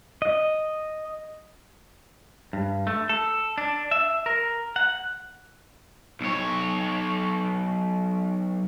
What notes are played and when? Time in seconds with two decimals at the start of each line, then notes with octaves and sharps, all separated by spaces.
0.22 D#5
2.53 G2
2.87 A3
3.09 A4
3.58 D4
3.91 E5
4.26 A#4
4.76 F#5
6.21 B1 C#5